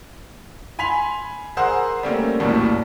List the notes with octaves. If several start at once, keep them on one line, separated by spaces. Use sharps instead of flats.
G#5 B5 C6 B6 F7
G#4 A#4 C5 F#5 E6
G3 A3 A#3 C4 C#4
A#1 D#2 A2 F#3 G3